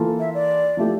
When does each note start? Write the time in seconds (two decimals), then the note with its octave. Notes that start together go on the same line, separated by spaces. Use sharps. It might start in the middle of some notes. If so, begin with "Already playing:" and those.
Already playing: E3 A#3 F4 A4
0.20 E5
0.34 D5
0.77 F3 A3 E4 G4